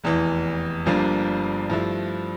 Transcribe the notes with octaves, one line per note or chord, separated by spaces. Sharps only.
F1 E2 E3
G1 G2 F3 A#3 D4
G2 F3 A3 E4